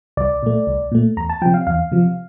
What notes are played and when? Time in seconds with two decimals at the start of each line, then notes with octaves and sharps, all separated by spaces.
0.17 C2 D5
0.43 A#2 A3
0.67 C2
0.92 A#2 A3
1.17 E2 A#5
1.30 A5
1.42 F3 G5
1.46 C3
1.54 F5
1.67 E2 F5
1.92 C3 F3